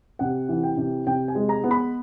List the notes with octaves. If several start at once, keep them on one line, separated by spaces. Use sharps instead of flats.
C3 F#5
E3
G5
C3
C3 G5
G#5
G#3
A#5
B3
B5